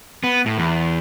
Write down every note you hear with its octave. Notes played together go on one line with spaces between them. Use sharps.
B3
A2
E2